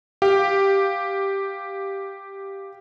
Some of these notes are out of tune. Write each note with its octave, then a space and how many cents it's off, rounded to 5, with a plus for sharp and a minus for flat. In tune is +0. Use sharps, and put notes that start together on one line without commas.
G4 +0 F5 +0